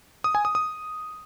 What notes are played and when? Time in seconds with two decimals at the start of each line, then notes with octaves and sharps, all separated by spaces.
0.24 D#6
0.35 G#5
0.45 D#6
0.55 D#6